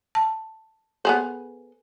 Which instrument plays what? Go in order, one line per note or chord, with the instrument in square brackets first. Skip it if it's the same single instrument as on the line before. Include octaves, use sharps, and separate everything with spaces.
[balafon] A5
[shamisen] B3 G#4 C5 [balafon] A4 G#5